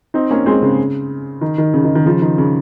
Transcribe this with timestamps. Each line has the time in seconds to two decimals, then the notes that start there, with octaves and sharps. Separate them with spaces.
0.14 C4 D#4
0.31 A#3 C#4
0.46 G#3 C4
0.62 C#3
1.41 D#3
1.58 D#3
1.74 C#3
1.84 D#3
1.95 D#3
2.06 C#3 F3
2.22 D#3
2.38 C#3